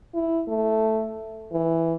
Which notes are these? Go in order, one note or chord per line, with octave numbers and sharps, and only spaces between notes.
E4
A3
E3